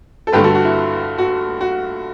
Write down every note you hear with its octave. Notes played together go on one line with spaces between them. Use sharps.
A4
G2 D3 A3 G4 B4
F#4 A4
F#4
E4
F#4
F#4